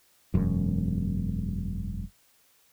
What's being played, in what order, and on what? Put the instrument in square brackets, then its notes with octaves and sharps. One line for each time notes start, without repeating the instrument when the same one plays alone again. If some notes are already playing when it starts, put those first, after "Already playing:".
[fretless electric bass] E1 F#2